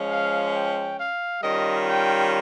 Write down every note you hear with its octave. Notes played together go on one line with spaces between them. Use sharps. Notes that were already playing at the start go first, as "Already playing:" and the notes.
Already playing: F3 G#3 C#4
F5
G5
F5
D#3 G3 C#4 F4 D#5
G5